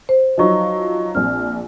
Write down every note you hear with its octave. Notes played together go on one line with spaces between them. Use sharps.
C5
F3 F#3 D#4 D#5 C#6
A#1 C4 F6